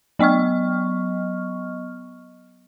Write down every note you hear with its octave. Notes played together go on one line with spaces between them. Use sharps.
F#3 B3 D#5 C#6 F6